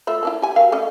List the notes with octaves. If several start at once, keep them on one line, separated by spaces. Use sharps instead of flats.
A3 F4 E5
A#3 D4 E4
G4 G#5
F#3 A#4 F5
A3 C#4 D#5